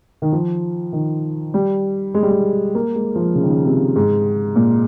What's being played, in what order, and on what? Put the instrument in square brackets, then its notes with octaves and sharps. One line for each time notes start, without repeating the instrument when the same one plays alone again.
[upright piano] D#3
F3
D#3
G3
G#3
G3
G#3
A#3
G#3
F3
C#3
D#3
C#3
C3
G#2
A#2